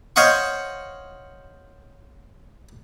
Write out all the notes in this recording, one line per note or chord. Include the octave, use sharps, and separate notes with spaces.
C5 C#5 D#5 F5 F#5 C#6